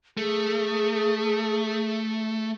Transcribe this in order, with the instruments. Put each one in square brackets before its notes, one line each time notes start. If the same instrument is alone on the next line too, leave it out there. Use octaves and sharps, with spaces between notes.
[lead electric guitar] A3 [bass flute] G#4